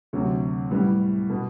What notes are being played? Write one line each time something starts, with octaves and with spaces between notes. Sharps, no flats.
D2 C3 F#3
A2 G3 B3
B2